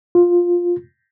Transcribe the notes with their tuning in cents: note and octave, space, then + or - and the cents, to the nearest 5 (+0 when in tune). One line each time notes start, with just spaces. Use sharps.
F4 +5